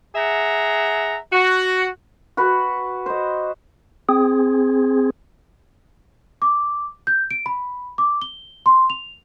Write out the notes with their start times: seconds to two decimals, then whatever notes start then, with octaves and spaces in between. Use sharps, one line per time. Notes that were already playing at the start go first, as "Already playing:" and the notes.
0.16 G#4 E5 F#5 A#5
1.32 F#4
2.37 F#4 B4
3.06 C5 D#5
4.09 C4 G#4
6.42 D6
7.07 G6
7.31 D7
7.46 B5
7.98 D6
8.22 G7
8.66 C6
8.90 F7